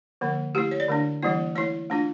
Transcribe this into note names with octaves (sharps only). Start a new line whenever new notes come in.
D3 F3 A#3
A3 E4 G4
C#5
D5
D3 A3 D4
E3 G3 A#3 E4
A3 E4 C#5
A3 D4 F4